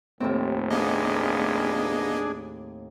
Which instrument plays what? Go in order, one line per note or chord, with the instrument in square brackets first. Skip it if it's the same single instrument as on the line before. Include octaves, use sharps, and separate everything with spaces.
[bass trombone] F1 [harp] D#2 A2 C4
[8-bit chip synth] A#3 B3 D#5 [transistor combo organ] D4 G#4